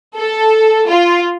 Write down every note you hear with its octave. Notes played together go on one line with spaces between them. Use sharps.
A4
F4